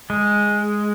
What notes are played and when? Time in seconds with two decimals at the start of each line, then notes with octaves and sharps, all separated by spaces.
0.10 G#3